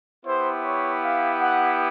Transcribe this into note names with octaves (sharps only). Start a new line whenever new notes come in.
B3 E4 G4 C5
C#5
F5
F#5